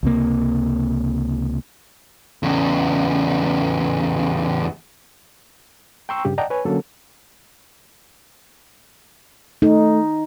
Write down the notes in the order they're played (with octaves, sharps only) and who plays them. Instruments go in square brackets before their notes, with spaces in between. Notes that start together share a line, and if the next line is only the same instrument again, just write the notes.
[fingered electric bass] C#2 C3 A#3
[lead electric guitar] E2 C#3
[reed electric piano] G5 A#5 C6 C#6 E6
G2 C#3 G4
D5 D#5 F#5 G5 A5 A#5
B4 C#5 G#5
D3 F#3 A#3 C#4 A4
[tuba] A3 [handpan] D#4